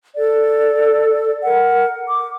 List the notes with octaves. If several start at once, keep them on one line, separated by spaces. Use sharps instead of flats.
A4 D5
A#4 F#5
D6